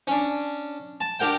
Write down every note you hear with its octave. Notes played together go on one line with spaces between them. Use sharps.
C#4 D4
A5
D4 G4 A#4 F#5 G5